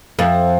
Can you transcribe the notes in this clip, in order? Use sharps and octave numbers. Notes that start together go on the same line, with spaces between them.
F2